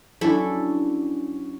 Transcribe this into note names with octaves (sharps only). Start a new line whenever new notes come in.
F#3 C#4 D4 E4 A4